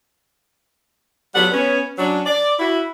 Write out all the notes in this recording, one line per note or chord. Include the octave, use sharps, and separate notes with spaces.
F#3 G3 B3 F4 A4 F#5
B3 C#4
F#3 C#4 D4
D5
E4 F#4